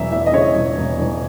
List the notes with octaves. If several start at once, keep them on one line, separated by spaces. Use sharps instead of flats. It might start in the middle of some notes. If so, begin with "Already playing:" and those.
Already playing: E1 F#3 E5
E2 E5
D#5
C#3 C#5
E1
E1
E1